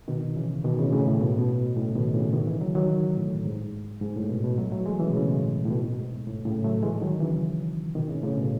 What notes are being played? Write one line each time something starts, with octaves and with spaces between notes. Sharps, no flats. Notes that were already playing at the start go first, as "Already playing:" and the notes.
B2 D#3
C#3 E3
B2 D#3
A2 C#3
A2 C#3
A2
B2
A2
B2
A2 C#3
B2 D#3
A2 C#3
B2 D#3
C#3 E3
D#3 F#3
D#3 F#3
A2
G#2
G#2
A2
B2
B2
F#3 A3
F#3 A3
E3 G#3
C#3 E3
B2
A2 C#3
A2
B2
G#2
A2
A2 C#3
F#3 A3
E3 G#3
D#3 F#3
C#3 E3
B2 D#3
A2 C#3
A2 C#3
B2